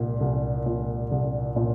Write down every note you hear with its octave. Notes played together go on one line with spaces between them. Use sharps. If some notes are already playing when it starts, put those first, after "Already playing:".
Already playing: C2 A#2
C2
A#2
C2
A#2